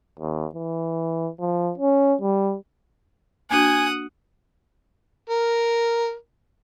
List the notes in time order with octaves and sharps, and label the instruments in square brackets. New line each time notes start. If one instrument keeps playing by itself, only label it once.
[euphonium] D#2
E3
F3
C#4
G3
[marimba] A#3 D4 F#4 [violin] F#5 D#6 [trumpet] G#5
[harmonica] A#4